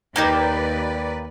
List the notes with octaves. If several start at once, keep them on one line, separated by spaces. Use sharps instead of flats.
D#2 A#3 D#4 G4 B4 D5